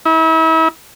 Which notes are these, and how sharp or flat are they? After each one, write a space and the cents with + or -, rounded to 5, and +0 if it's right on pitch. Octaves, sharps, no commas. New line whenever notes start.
E4 -35